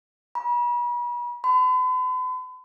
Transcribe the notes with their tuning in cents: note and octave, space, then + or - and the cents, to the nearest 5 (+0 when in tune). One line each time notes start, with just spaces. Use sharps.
B5 -40
B5 +45